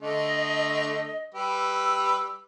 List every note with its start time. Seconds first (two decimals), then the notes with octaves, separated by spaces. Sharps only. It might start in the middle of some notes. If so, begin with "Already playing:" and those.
0.02 D3 A3 D#5
1.35 G3 G4 B4 E6